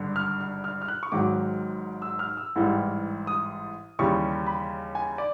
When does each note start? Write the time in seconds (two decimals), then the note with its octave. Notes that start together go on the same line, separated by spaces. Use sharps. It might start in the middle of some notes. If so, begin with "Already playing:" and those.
Already playing: G#1 G2 D3
0.16 F6
0.40 F6
0.64 F6
0.82 F6
0.88 F#6
1.03 C#6
1.12 G#1 G#2 D#3 F#3 D6
2.02 E6
2.19 F6
2.37 E6
2.56 A1 G#2 E3 G3
3.27 D#6
3.99 D#2 C#3 E3 G3 C#6
4.46 B5
4.95 G#5
5.18 D5